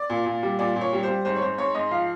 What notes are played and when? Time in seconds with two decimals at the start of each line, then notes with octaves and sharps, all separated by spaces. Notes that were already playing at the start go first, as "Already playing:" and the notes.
Already playing: D5
0.10 A#2
0.26 A#2
0.43 G3
0.59 A#2 D5
0.76 A#2
0.81 C#5
0.93 G3
1.03 C5
1.08 G3
1.25 G#2 C5
1.36 C#5
1.42 G#2 C5
1.58 G#2 C#5
1.75 G#2 D#5
1.91 F3 F5